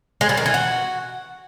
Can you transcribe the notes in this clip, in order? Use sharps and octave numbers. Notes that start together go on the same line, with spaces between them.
G#3
G3
D#3
E3
F#4